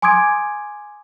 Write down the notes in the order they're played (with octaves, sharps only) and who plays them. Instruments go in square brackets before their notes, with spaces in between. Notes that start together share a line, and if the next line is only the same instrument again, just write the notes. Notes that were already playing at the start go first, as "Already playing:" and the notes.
[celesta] G#5 C6 D6 D#6 G#6 D7